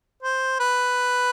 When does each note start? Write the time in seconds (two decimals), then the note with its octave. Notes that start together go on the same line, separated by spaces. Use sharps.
0.22 C5
0.60 B4